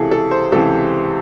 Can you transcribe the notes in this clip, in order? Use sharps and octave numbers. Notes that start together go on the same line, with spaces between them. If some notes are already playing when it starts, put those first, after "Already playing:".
Already playing: C#2 C3 E3 E4 G#4 A4
A4
C5
C#2 C3 E3 A4